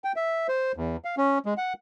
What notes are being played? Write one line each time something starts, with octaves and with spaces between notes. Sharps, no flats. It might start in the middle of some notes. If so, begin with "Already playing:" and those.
G5
E5
C5
E2
F5
C#4
G#3
F#5